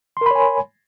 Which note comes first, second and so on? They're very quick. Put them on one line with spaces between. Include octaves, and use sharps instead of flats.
C6 A#4 B5 C#5 G#5